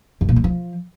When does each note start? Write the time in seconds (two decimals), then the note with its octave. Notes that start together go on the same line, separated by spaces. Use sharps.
0.21 F#2
0.29 A#2
0.36 G3
0.44 F3